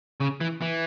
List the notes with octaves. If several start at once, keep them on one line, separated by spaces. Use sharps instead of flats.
C#3
E3
E3